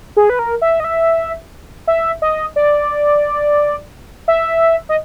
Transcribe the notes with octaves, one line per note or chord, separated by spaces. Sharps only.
G#4
B4
A#4
E5
D#5
E5
E5
D#5
D5
E5
D#5